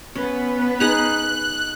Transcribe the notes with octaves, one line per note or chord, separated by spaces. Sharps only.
B3 C#4 B4
D#4 G#4 A#5 F#6